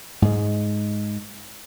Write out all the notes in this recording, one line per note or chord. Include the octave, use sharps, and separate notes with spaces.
G#2 G#3